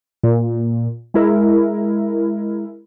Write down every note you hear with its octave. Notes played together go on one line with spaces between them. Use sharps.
A#2
G#3 E4 A#4